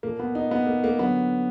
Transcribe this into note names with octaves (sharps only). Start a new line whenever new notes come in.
A#2 F3 A#3
B3
D#4
B3
A#3
A#3
D3 F#3 B3